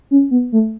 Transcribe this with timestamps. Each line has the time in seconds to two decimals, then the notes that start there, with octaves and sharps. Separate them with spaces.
0.11 C#4
0.31 B3
0.52 A3